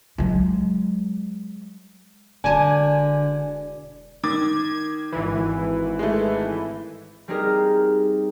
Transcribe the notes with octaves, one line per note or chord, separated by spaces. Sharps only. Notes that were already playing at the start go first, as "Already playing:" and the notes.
F#3 G#3
E1 D3 D5 G#5 A5
D#3 D6 G#6 A6
G#1 E3
G#3 A3
G3 C4 D#4 G4 G#4 A#4